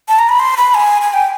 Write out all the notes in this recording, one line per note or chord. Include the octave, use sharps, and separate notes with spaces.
A5
A#5
B5
C6
B5
G#5
G#5
G5